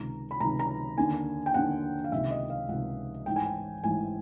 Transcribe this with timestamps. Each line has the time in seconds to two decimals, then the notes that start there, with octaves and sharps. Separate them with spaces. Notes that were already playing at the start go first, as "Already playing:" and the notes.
Already playing: C#2 C3 D#3 A#5
0.31 B5
0.40 C#2 C3 D#3 A#5
0.59 A#5
0.98 D#2 D3 G#5
1.46 G5
1.54 D#2 D3 F#5
2.04 F5
2.12 C#2 C3 D#3 E5
2.31 D#5
2.50 F5
2.69 C#2 C3 D#3 F#5
3.26 A1 G#2 E3 G5
3.36 G#5
3.46 G5
3.84 A1 G#2 E3 G#5